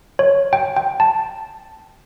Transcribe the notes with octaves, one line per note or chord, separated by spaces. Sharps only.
C#5
G5
G5
A5